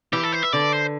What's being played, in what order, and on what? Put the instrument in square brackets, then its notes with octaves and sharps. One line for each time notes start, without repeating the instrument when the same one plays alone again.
[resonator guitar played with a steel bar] E3 [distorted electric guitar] G4
[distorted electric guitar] A4
C5
E5
[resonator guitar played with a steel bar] D3 [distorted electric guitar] D5
[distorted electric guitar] C5